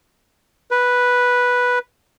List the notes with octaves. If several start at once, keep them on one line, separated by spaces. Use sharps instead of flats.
B4